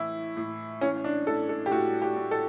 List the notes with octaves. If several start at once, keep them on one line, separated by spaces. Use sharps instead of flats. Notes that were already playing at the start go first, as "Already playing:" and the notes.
Already playing: A2 E3 E4
A2
E3 C#4
D4
A2 A4
A4
G4
A2 F#4
G4
A2
A4